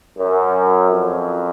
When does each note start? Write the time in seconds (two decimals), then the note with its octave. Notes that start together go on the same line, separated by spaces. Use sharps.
0.18 F#2
0.90 F2